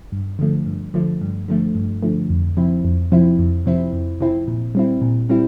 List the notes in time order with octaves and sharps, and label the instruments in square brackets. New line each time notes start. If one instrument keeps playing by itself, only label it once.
[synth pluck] G2
D3 F3 A3
G2
D3 F3 A3
G2
D3 F3 A3
G2
D3 F3 A3
F2
C3 F3 C4 E4
F2
C3 F3 C4 E4
F2
C3 F3 C4 E4
F2
C3 F3 C4 E4
A#2
G3 C4 E4
A#2
G3 C4 E4